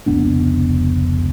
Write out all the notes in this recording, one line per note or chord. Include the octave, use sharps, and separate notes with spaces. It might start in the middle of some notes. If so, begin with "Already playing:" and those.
F1 C#2 B3 D4